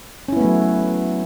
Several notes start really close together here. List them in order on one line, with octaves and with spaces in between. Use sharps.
C#4 E4 B3 A3 F#3